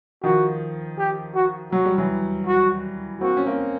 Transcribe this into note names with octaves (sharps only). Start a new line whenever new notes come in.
D#3 F3 F#4
G4
F#4
F#3 F#4
G3
E3 F#3
F#4
A#3 C4 F#4
C#4
A#3 C4